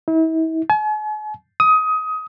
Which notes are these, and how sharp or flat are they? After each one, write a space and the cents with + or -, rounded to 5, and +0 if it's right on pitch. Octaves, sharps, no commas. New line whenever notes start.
E4 -40
G#5 +45
D#6 +20